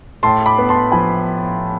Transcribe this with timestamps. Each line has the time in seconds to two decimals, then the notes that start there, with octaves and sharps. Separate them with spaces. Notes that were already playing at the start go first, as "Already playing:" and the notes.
0.23 A2 A5 C6
0.46 B5 D6
0.58 B3
0.69 A5 C6
0.92 F3 G#5 B5